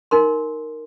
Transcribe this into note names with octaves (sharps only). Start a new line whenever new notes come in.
D#4 A#4 C6